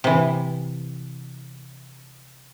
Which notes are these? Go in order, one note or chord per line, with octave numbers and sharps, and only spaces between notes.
C3 E3